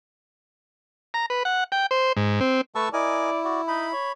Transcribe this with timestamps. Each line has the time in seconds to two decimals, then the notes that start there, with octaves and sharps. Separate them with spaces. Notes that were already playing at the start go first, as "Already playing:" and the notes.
1.14 A#5
1.30 B4
1.45 F#5
1.72 G5
1.91 C5
2.17 G#2
2.40 C4
2.75 A3 B4 A5 C#6 E6
2.93 E4 A#4 D5 D#5 G#5
3.44 F#4 D5
3.68 D#4 B5
3.93 C#5